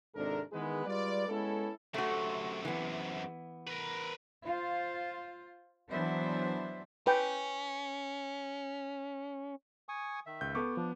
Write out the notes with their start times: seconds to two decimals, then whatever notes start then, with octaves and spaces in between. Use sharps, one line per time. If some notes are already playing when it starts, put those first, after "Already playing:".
0.15 G#1 G#2 C3 D4 A4 A#4
0.52 D#3 E3 G#3 B3 G#4 B4
0.86 G3 G#3 F4 B4 D5
1.28 G#3 B3 C#4 E4 A4
1.94 F#2 C3 A3 F#4
2.65 E3 B3
3.67 A#4 B4
4.45 F4 C5
5.90 E3 F#3 B3 D4 C5 E5
7.07 C#4 B4 G5
9.89 G#5 C#6 D#6
10.26 D#3 E5
10.41 C#2 G6
10.55 B3 A4 C#6 D6
10.77 F3 D4